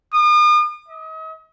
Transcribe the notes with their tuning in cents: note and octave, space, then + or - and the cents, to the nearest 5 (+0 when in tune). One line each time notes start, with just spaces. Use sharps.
D#6 -45
D#5 +40